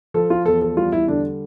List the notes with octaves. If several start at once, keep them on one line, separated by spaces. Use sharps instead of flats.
F3 A4
F4
E2 A4
A4
G3 F4
E4
D3 D4